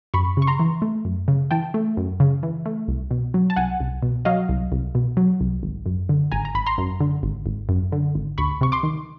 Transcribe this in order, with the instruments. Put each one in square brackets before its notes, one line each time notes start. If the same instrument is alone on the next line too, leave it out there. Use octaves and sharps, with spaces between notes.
[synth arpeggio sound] F#2 B5 C#6
C#3 C#6
A#5 C6
E3
A3
F#2
C#3
E3 G5 A5
A3
F#2
C#3
E3
A3
C2
B2
F#3
A5
C2 F#5 G#5
C2
B2
F#3 D#5 F5
C2
C2
B2
F#3
C2
G#1
F#2
D3
G#1 G#5 A#5
A#5
G#1 B5
A#5 C6
F#2
D3
G#1
G#1
F#2
D3
G#1
D2 B5 C#6
C3 C#6
C6 D6
D#3